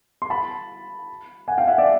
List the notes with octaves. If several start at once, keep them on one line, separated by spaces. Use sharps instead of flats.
C6
A5 B5
F#5 G#5
F5 G5
E5 F#5
D5 E5